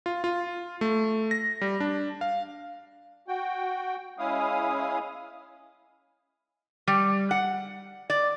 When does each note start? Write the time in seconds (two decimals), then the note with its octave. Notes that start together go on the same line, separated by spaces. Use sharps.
0.06 F4
0.24 F4
0.81 A3
1.31 A#6
1.61 G3
1.80 D4
2.21 F5
3.28 F#4 G5
4.19 G#3 C#4 E4 F5 D#6
6.87 G3
7.31 F#5
8.10 D5